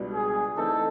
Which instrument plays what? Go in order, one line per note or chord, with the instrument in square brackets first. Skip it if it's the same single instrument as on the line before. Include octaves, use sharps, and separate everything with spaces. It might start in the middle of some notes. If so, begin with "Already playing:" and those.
Already playing: [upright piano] C#2 B2 G3 B3 D4
[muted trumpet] G#4
[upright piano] E3 A3 C4 D#4 [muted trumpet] A4